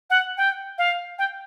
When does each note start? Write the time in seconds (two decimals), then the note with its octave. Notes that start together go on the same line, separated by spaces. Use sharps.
0.10 F#5
0.37 G5
0.78 F5
1.19 G5